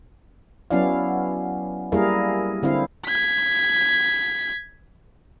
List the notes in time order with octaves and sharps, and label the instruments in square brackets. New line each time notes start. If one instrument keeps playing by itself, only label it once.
[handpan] F#3 B3 C#4 E4 D5 F5
G3 A#3 E4 G#4 A#4 F5
D3 C4 E4 F5
[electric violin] G#6 B6